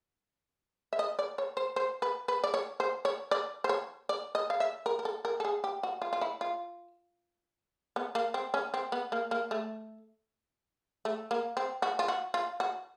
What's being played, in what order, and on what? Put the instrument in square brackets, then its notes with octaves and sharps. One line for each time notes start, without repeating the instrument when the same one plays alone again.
[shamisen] E5
D#5
D5
C#5
C5
C5
B4
B4
D5
C#5
C5
C#5
D5
C5
C#5
D5
D#5
F5
E5
A#4
A#4
A4
A#4
A4
G#4
G4
F#4
F4
F4
E4
F4
B3
A#3
C4
C#4
C4
B3
A#3
A#3
A3
A3
A#3
C4
F#4
F4
F#4
F4
F#4